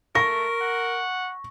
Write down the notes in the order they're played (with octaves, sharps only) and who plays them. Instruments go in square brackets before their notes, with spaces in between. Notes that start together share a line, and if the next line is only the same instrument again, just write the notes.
[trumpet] A3 [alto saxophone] A#4 [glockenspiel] C#6 [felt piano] A#6
[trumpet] F#5